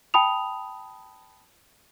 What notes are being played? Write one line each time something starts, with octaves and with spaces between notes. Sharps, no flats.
G5 A5 B5 D#6 F7